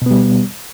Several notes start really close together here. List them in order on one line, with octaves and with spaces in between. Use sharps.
B2 B3 G3